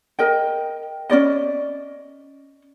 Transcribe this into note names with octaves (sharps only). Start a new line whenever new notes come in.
A#4 D#5 G5
C#4 F#4 D5 D#5